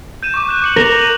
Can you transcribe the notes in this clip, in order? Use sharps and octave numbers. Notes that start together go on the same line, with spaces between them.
G6 D#7 E7
C#6 D6
D6 F#6 E7
D6 C#7 F#7
A#4 E7 F7
D#7 E7 F#7